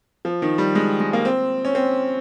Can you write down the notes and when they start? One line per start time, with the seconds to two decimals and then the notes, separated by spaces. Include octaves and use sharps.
0.25 F3
0.42 D#3
0.58 G3
0.75 G#3
1.00 G#3
1.13 A#3
1.25 C4
1.65 C#4
1.75 C4